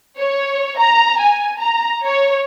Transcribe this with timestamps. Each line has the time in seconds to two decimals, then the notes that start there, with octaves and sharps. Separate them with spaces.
0.18 C#5
0.78 A#5
1.20 G#5
1.59 A#5
2.06 C#5